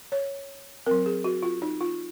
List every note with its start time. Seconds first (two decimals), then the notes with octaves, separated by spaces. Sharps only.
0.12 C#5
0.86 F#3 C4 A#4
1.06 G#4
1.24 F#4
1.43 F4
1.62 D#4
1.81 F4